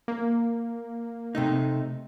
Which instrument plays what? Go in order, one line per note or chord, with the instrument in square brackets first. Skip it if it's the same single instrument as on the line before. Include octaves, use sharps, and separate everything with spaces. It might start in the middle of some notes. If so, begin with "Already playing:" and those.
[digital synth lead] A#3
[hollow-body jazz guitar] C3 A3 D#4